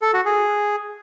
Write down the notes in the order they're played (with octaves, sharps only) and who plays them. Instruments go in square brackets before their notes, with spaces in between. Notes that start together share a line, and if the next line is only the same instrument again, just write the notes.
[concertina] A4
F#4
G#4